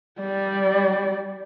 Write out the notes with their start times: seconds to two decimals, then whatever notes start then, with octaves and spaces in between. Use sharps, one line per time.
0.21 G3 D5